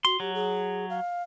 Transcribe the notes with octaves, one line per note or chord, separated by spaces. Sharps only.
F#4 C6
F#3 G4
G#4
F5